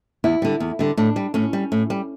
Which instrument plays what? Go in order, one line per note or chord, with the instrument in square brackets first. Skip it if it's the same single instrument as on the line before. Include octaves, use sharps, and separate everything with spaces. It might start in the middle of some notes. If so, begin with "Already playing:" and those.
[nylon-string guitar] E2 E4
D3 G3
E2
D3 G3
A2 D4
G3
A2 C#4
G3
A2
G3